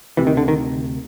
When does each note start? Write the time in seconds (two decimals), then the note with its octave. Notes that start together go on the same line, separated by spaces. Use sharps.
0.17 D2 C3 E3
0.27 D#3
0.37 D3
0.48 D#3